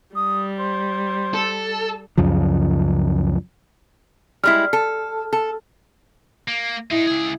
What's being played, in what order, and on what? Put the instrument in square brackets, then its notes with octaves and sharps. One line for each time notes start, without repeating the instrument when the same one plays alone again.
[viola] G3 [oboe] D#6
[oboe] C5
[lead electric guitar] A4
[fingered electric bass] C#2 F#2 C#3 F3
[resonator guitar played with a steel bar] G3 G#3 E4 [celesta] F6
[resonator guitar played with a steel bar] A4
A4
[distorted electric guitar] A#3
[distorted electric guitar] G#3 D#4 [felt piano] E4
[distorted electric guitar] C#2 G#4